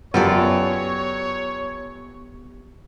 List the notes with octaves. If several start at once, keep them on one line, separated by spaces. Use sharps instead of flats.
F#2 B3 F4 G4 A4 C#5 D5